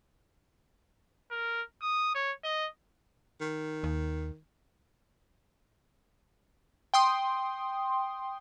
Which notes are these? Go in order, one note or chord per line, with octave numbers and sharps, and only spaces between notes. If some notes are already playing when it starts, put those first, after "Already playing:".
A#4
D#6
C#5
D#5
D#3
D#2
G5 C6 D#6